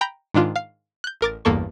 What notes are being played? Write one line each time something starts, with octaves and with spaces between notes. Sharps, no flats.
G5 A#5 B5 G6
G#2 D#3 D4 F4
F5 C7
F#6 G6
A1 A#4 D6 A6
A1 E2 G2 A#3 A4 C#6